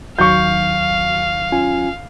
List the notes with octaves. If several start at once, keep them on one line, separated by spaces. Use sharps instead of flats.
D#2 D#3 F#3 F5 C#6 G6
C#4 F4 G#5